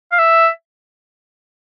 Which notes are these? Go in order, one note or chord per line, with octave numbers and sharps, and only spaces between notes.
F5
E5